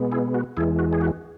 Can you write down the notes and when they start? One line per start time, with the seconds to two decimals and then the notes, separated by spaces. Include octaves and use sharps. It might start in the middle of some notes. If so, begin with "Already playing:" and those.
Already playing: B2 G#3 B3
0.12 E4 G#4
0.34 F#4
0.57 E2 E3 G#3 E4 G#4
0.79 F#4
0.93 G#4
1.01 F#4